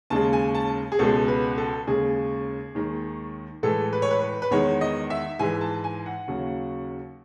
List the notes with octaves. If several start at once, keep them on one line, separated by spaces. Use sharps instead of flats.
D#2 C#3 G#3 A5
G#5
A5
G#4
C#2 B2 G#3 A4
B4
A4
D#2 C#3 G#3 G#4
D#2 D#3 G#3
A2 E3 G#3 A4
B4
C#5
B4
B4
B4
E2 D#3 G#3 C#5
D#5
E5
G#2 E3 G#3 G#5
A5
G#5
F#5
D#2 C#3 F#3